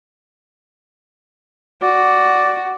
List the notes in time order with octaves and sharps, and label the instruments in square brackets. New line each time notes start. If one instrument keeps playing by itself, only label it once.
[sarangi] F#4 [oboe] D5